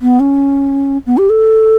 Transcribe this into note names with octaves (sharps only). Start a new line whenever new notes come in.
B3
C#4
B3
G4
A4